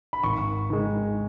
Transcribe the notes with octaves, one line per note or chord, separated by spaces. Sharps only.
B5
G#1 C#6
D#3 G#3